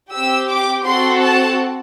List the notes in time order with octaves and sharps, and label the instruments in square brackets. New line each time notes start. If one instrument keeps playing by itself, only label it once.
[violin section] C4 G4 E6
D6
C4 F#4 A4 C6
A5